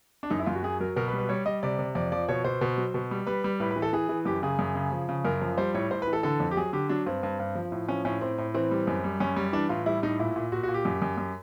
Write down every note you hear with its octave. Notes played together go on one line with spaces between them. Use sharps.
D4
F#2 D#4
E4
F#2 F4
F#4
F#3 G#4
F#3 A#4
B2 A#4
B4
G3
B4
G3 C#5
G3 D#5
C3 D5
C3
F2 D5
F3 D5
B2 C#5
B2 C5
B2
F#3
B2
G3
G3 B4
G3
A2 B4
B4
E3
A4
E3 G#4
E3
F#2 G4
C#3 G#4
F#2
C#3
F3
C#3
F#2 A#4
F3
G3 C5
A2 C#5
A2 C5
B4
E3
A4
D3 A4
F2
G4
F#3 G#4
D3 G4
F#3 D4
G2 C4
G2
G2
F3
A2
F3 C#4
A2 C#4
A2 C4
A2
E3 C4
G3
F#2
G3
F#2 C#4
G3
E3 D4
A2 F4
G3 E4
A2 D#4
A#2 E4
A#2
A#2 F#4
F#4
A#2
G4
F#2
F#2
F#2